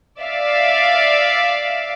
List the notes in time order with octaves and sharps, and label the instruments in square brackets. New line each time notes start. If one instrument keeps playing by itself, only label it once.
[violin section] D5 E5 F5